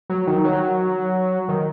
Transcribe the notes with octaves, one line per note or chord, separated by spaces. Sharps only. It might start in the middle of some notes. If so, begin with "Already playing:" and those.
F#3
D#3
F#3
D#3